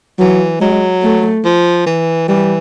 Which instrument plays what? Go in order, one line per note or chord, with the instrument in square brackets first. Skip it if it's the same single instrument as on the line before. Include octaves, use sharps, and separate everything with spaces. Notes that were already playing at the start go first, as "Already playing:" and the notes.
[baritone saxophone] E3 [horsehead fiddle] F#3
[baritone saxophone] F#3 [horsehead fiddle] G#3
[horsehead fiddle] A3
[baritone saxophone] F3
E3
[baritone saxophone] E3 [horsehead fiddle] G3